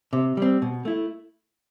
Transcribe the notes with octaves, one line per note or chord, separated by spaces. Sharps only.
C3
G3 C4
B2
A3 E4